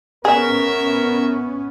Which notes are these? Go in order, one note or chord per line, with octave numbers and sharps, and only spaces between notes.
B3 C#4 G#4 A#4 E5